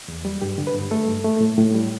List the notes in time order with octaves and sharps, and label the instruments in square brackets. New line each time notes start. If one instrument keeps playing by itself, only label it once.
[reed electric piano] E2
G3
G2 G4
D3
B4
G2
A3 A4
G2
A3
A2
A2
G3